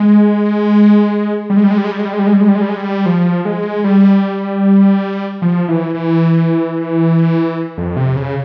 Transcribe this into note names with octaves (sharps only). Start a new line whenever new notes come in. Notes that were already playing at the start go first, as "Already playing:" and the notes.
Already playing: G#3
G3
G#3
G3
G#3
G3
G#3
G3
G#3
G3
G#3
G3
G#3
G3
G#3
G3
G#3
G3
G#3
G3
F3
G#3
G3
F3
E3
E3
F2
C3
C#3